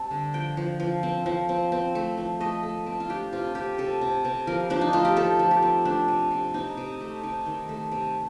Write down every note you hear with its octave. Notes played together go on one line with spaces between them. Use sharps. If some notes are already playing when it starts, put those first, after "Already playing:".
Already playing: G3 C4 A5
D3
F3 G5
F3
F3
C4
F3
C4
C4
A3
F3
A3 D#5
A3
C4
F4
D4 G4
C3 F4
C3 G4
C3 A4
C3
C3
F3 A#4
F3 D4
D#4
A3 F4
G4
F3 A4
F3
G4
C4
A3 D4
C3
C3
C3 D#4
C3
A3
C3 D#4
D#3
A3
C3